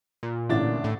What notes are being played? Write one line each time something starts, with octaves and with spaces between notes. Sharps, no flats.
A#2
A1 D3 D4 E4 A6
A2